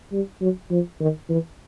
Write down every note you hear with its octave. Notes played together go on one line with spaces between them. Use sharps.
G3
F#3
F3
D#3
E3